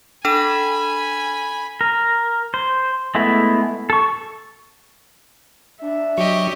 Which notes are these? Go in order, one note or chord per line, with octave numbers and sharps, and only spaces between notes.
D4 A4 G#5 B5 E7
A#4
C5
G#3 A3 B3 E4
A4 C#6
D4 E5
F#3 G4 D#5 C#6